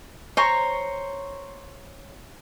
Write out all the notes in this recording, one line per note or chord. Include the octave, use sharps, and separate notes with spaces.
C5 C#5 A#5 C#6